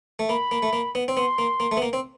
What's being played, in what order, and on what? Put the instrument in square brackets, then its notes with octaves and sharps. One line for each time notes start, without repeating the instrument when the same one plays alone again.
[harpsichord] A3
[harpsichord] A#3 [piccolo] B5
[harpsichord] A#3
A3
A#3
B3
C4
[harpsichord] B3 [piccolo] C6
[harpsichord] A#3
A#3
A3
B3
A#3
C4